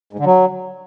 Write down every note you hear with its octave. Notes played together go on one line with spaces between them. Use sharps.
G#2
D3
F#3